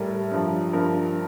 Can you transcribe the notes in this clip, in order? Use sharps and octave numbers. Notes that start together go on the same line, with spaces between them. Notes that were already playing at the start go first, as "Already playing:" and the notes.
Already playing: A2 G3 A#4
G2 F3
G2 F3 A#4